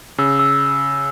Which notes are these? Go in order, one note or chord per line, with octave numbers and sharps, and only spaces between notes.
C#3 E6
E6